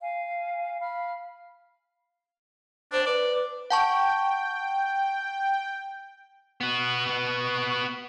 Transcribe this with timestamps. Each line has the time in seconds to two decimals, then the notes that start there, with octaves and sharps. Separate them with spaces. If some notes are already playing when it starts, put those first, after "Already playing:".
0.02 F5 G#5
0.80 F5 B5 F6
2.92 D4 C5
3.07 B4 D5
3.70 F#5 G5 A5 C#6
6.61 B3 F#4